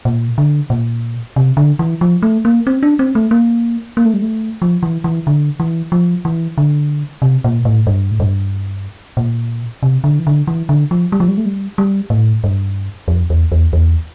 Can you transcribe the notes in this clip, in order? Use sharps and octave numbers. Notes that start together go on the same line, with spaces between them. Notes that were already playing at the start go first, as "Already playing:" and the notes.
A#2
D3
A#2
C3
D3
E3
F3
A3
A#3
C4
D4
C4
A3
A#3
A#3
A3
G3
A3
F3
E3
E3
D3
E3
F3
E3
D3
C3
A#2
A2
G2
A2
G2
A#2
C3
D3
E3
D3
E3
D3
F3
G3
F3
G3
A3
G3
G3
A2
G2
F2
E2
E2
E2